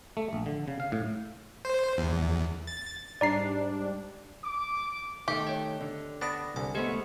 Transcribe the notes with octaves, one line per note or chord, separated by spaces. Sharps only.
A3
A#1
D3
C#3
F5
A2
C5
E2
A6
G#2 G3 D4 D5 A#5 C7
D6
D#3 A3 G4
C#5 D#5
D3
B3 D4 D5 B5 D#6 A#6
C2 D3 G#5
G#3 A3 B3 G4 C5 D#5